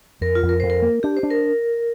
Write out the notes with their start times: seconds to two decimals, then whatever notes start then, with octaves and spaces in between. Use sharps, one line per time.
0.21 F2 A#4
0.35 F4
0.43 F2
0.49 A#4
0.60 F2 C5
0.70 A#4
0.82 A#3
1.03 D4 G4
1.17 C5
1.23 D4
1.31 A#4